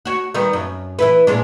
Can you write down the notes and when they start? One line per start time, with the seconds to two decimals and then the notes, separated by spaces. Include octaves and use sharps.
0.05 F#4 C#5
0.34 D#3 G3 B3
0.53 F#2
0.99 E3 E4 B4
1.27 A#2 G#3 D4